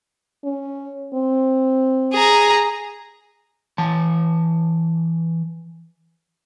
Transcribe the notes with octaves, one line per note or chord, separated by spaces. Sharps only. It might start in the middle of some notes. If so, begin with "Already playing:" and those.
C#4
C4
G#4 A#5
E3 A5